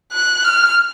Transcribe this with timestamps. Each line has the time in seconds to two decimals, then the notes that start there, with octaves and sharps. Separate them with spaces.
0.13 F#6
0.44 F6